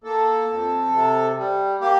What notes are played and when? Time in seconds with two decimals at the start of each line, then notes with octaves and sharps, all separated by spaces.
0.04 A#3 A4
0.48 F2
0.92 C3
1.36 G3
1.81 A#3 G4